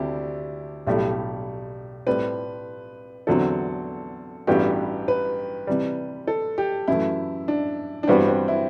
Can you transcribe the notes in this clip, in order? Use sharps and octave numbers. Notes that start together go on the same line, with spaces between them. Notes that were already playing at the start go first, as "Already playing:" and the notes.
Already playing: D2 C3 G3 D4 E4 G4
B1 A2 G3 D4 G4
A2 G3 C4 B4
E2 D3 F#3 C4 A4
A1 G2 E3 B3 F#4 G4
B4
C3 E3 G3
A4
G4
F#2 E3 A3 E4
D4
D4
G2 E3 G3 B3 C4 F#4
C4
E4